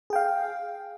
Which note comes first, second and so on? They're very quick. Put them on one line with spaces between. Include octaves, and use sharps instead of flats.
G#4 G5 F5